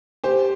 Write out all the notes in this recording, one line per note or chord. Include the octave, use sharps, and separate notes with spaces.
G4 C5